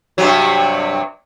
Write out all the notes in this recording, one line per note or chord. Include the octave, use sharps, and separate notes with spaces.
G2 C3 F#3